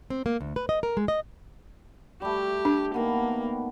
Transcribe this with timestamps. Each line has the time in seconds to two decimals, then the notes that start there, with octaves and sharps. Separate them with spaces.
0.10 C4
0.26 A#3
0.41 D2
0.56 B4
0.69 D#5
0.83 A#4
0.97 G#3
1.08 D#5
2.22 G3 A3 G4
2.65 D4
2.94 D#3 A#3 B3